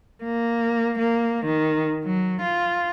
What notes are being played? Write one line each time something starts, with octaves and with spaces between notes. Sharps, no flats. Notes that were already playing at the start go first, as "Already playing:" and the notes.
A#3
A#3
D#3
F#3
F4